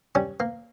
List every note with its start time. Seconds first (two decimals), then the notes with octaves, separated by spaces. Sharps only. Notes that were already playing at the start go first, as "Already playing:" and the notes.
0.15 G3 C#4
0.40 A#3